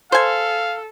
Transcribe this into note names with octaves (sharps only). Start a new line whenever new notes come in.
A4 C5 F5 G#5